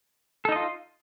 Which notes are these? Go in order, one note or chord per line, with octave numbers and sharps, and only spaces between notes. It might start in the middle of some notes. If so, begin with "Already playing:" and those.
D#4 F4 A4 D#5